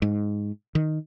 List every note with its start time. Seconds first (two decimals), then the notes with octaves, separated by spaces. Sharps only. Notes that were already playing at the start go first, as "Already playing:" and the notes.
0.02 G#2
0.75 D#3